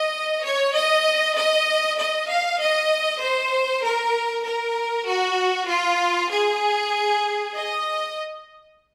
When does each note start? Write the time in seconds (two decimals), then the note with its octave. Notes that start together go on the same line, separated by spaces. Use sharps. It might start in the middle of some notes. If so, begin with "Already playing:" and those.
Already playing: D#5
0.43 C#5
0.74 D#5
1.36 D#5
1.98 D#5
2.29 F5
2.59 D#5
3.21 C5
3.83 A#4
4.45 A#4
5.07 F#4
5.69 F4
6.30 G#4
7.54 D#5